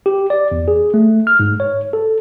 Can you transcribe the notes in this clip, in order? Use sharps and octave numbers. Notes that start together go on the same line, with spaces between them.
G4
D5
E2
G#4
A3
F6
G#2
C#5
A4